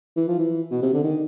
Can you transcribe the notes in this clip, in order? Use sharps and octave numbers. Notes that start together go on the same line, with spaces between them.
E3
F3
E3
B2
C3
D3
D#3